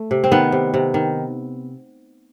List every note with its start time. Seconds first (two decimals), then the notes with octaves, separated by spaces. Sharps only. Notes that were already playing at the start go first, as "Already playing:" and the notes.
Already playing: A3
0.11 C3
0.24 C4
0.31 D#3 B3
0.52 C3
0.74 C3
0.94 D#3